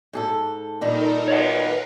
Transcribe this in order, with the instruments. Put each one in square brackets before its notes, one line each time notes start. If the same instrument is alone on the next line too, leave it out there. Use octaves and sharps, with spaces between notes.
[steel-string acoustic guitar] G#2 G#4 A4
[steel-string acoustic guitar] A#2 D#3 G3 [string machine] D#4 A4 A#4
[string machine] A#4 B4 [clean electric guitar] C#5 D#5 F#5